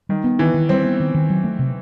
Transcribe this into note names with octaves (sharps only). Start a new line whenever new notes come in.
D#3 G3
B3
D#3 E3
D#3
G3 C4
B3
D#3
D#3
F#3
A3
C3